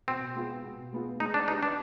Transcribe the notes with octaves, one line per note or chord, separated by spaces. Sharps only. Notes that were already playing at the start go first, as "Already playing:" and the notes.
B2 C4
G#3 B3 F4
B2
G#3 B3 F4
G#3 D#4
D4
D4 D#4 G4 B4
D4